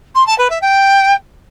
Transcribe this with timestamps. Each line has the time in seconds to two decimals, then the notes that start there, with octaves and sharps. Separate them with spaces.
0.15 C6
0.26 A5
0.38 B4
0.50 E5
0.61 G5